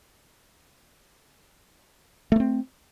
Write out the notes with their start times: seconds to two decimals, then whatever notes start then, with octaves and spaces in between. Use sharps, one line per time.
2.32 A3
2.36 A#3
2.40 C4